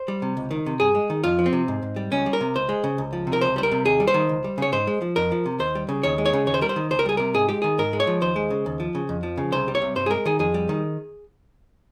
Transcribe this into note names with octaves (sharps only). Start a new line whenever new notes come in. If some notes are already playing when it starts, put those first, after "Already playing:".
Already playing: C5
G3
C3
C#2
D#3
C3
G2 G#4
G#3
D#3
F2 F4
F3
C4
C3
G#2
G#2
G3
C#2 C#4
G3
A#4
C3
C#2 C5
G#3
C#3
C#2
F3
C3
A#4
C#2 C5
G3 C5
A#4
C3
D#2 G#4
G3
C5
D#3
C#2
G3
C#3 C#5
G#2 C5
G#3
F3
F2 A#4
F3
C3
D#2 C5
G3
C#3
D#2 C#5
G#3
C#5
C#3
D#2 C#5
C5
G3 A#4
C5
D#3
C#2 C5
A#4
G3 G#4
C3 A#4
G#2 G#4
G#3 G4
D#3 G#4
G#2 A#4
G#3
C#5
F3
D#2 C5
G#3
C#3
D#2
F3
C#3
F2
F3
C#3
C2 C5
G3
C#5
C3
G2 C5
G#4
G#3 A#4
D#3 G#4
F2 G#4
G3
D#3